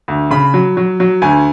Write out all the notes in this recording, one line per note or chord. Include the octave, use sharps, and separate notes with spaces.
D2
C#3 B5
F#3
F#3
F#3
D2 G#5